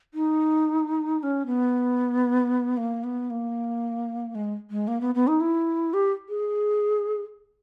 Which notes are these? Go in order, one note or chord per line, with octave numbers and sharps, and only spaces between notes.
D#4
D#4
C#4
B3
A#3
B3
A#3
G#3
G#3
A#3
B3
B3
D#4
E4
G4
G#4